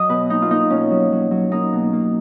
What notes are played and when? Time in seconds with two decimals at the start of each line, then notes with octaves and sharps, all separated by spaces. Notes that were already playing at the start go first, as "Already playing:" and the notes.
Already playing: F#3 D#5
0.09 B2 B4
0.30 A#3 D#4
0.42 F4
0.50 A#3 D#4
0.70 B2 C#4
0.91 F#3
1.12 F#3
1.31 F#3
1.52 A#3 D#4
1.73 B2
1.93 A#3